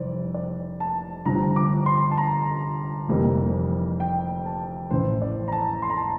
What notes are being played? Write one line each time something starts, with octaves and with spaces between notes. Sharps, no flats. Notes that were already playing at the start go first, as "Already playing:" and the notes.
Already playing: F1 E3 G3 C5 D5
D5
A5
G1 G2 F3 A#5
D6
C6
A5
A#5
F1 F2 E3 G3 A#3
G5
A5
A1 A2 E3 C5
D5
A#5
A5
C6
A#5
A5